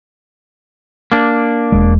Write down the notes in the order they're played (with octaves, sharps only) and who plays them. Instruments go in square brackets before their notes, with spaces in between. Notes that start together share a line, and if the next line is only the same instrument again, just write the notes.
[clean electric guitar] A#3 D4
[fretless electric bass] E1 G#3